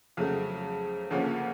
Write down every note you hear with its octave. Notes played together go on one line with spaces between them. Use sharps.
F2 C#3 F#3 A3
D2 C#3 F3 A#3 C#4